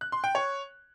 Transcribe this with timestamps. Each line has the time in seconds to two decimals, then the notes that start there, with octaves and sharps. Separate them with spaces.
0.01 F#6
0.12 C6
0.24 G5
0.35 C#5